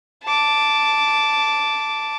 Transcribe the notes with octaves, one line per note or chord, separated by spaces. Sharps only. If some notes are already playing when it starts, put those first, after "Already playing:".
A5 D6